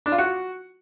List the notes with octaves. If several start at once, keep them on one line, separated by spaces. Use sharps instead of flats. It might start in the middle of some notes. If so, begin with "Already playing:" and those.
D4
F4
F#4